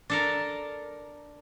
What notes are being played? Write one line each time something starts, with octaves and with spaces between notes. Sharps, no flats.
D4 A4 A#4